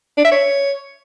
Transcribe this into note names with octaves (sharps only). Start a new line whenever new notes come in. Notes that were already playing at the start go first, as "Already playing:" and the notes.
D4
E5
C#5